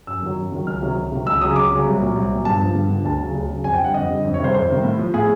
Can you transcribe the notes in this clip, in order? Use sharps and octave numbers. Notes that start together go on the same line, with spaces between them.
F#2 E6
D#3 F#3
F#2
D#3 F#3
C#2 F6
C3 D#3 F#3
C#2
C3 D#3 F#3
C#2 E6
C#3 F#3 D#6
C#2 D6
C#3 F#3
C2
A#2 F#3
C2
A#2 F#3
G2 A5
D3 F3
G2
D3 F3
D2 A5
C#3 F#3
D2
C#3 F#3
F2 G#5
G5
D3 G3 F#5
F2 D#5
D3 G3
F2
C#5
C3 D#3 G3 C5
F2 C5
C3 D#3 G3
A2
F3
A2 G#4